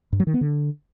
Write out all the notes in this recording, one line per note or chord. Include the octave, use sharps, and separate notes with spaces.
G2
F#3
D#3
B3
D3